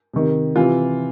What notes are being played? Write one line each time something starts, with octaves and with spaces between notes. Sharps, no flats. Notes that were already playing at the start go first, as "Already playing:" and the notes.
C3 D#3
C3 E3 F4